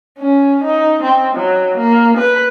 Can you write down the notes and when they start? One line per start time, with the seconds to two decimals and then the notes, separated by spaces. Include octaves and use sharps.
0.18 C#4
0.64 D#4
1.03 C4
1.36 F#3
1.77 A#3
2.18 B4